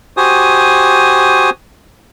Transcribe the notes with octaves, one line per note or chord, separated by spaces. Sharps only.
F#4 G4 C5 G#5 D#6